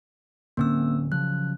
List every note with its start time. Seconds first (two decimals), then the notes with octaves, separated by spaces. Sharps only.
0.57 D1 D3 A#3 C4 C#4 E6
1.12 C#3 F3 F#3 F#6